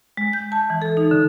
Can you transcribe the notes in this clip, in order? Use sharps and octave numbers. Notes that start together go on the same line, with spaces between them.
G#3
G6
A5
E3
A4
D#4
D3